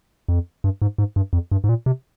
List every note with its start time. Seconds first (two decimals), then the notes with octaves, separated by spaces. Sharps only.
0.28 F2
0.64 G2
0.82 G#2
0.98 G#2
1.16 G2
1.33 F2
1.51 G2
1.64 G#2
1.69 A#2
1.86 C3